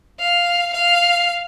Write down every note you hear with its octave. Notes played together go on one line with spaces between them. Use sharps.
F5
F5